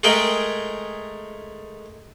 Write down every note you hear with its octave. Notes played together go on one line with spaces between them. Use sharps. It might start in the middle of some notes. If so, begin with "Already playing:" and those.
G#3 A3 G#4 A#4 G5